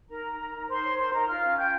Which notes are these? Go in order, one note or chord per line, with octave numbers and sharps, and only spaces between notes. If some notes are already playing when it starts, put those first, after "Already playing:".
D#4 A#4 A#5
D#4
A#4
D#4
D#4 C5 C6
C#5
A#4 C5 C6
D#4 A#4 A#5
F4 F5 F6
C#4
F4 G5 G6